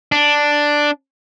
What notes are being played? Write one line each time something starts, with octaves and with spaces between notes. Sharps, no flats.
D4